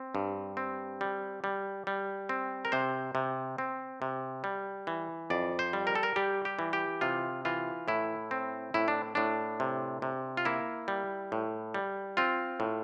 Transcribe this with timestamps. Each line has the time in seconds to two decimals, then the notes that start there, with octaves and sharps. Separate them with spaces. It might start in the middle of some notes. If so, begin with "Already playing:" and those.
Already playing: C4
0.15 G2
0.57 C4
1.01 G3
1.44 G3
1.87 G3
2.29 C4
2.65 A#4
2.72 C3 C5
3.15 C3
3.58 C4
4.02 C3
4.44 G3
4.87 E3
5.30 F2 D5
5.59 C5
5.73 G3
5.87 A#4
5.95 A4
6.03 A#4
6.16 G3 G4
6.45 G4
6.59 E3
6.73 G4
7.01 C3 F4
7.45 E3 F4
7.88 A2 E4
8.31 C4
8.74 A2 E4
8.88 D4
9.15 A2 D4
9.60 C3
10.02 C3
10.37 F4
10.45 A#3 E4
10.88 G3
11.32 A2
11.74 G3
12.17 C4 F4
12.60 A2